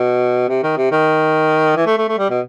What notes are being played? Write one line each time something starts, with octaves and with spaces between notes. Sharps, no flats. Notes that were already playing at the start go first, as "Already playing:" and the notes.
Already playing: B2
C3
D#3
C3
D#3
E3
A3
A3
A3
G3
B2